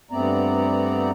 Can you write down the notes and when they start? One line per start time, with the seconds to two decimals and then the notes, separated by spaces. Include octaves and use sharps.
0.11 G2 A3 B3 C4 D5 A#5